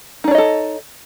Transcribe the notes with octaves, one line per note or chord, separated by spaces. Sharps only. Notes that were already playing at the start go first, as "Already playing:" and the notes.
D4 D#4 A4 C#5 D#5